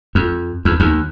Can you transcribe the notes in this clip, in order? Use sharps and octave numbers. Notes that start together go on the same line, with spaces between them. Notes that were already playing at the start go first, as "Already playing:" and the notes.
F2
E2
D#2